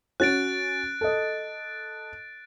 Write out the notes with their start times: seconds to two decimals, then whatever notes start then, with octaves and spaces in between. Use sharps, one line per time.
0.20 C#4 F#4 F#6 A6 D7
1.01 A4 D#5